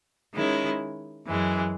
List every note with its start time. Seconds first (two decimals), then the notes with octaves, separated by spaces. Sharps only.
0.34 D#3 G#3 C#4 E4
1.26 F#2 E3 G#3